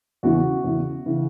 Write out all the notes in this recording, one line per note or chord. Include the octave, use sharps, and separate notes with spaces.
E2 C#3 E3 F#4
E2 C#3 E3
C#3 E3